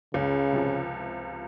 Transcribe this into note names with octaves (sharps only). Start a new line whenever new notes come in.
C#2 C#3
C3 F3